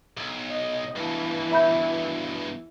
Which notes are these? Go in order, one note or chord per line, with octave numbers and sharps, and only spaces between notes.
B1
D#5
G2 B2 E3
E5 B5 G6